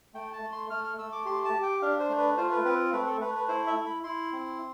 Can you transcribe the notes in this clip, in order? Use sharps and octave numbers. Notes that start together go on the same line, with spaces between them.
A3 G5
A5
A3
C6
A3 F6
F6
A3 E6
D6
G4 C6
A5
G4
G5
D4 F5
C5
A3
B4
F4 C5
B4
C4 B4
A3 B4
A4
A3 B4
B4
E4 C5
E5
E4
B5
E4 C6
C4